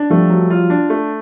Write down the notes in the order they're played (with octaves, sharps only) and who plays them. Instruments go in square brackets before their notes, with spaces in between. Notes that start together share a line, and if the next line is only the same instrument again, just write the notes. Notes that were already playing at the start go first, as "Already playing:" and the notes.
Already playing: [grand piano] D4
[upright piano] F3 G3 [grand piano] A3
[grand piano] F#3
F4
D4
A3